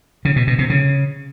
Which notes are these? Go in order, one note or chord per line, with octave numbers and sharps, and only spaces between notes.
C#3
B2
B2
C3
C#3